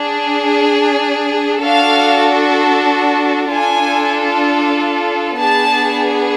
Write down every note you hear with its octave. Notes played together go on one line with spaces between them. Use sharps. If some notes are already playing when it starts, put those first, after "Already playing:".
Already playing: D4 G#4
D4 F#4 A4 F5
D4 F4 A4 G#5
B3 D4 G#4 A5